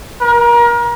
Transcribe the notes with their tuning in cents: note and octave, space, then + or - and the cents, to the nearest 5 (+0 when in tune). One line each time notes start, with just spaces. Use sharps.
A#4 +30